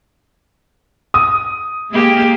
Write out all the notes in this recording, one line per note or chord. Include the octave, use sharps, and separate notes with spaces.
D#6
G#3 A#3 G4